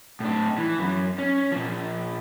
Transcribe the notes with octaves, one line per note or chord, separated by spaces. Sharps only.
A2 D4
E3
F#2
C#4
A#2 F3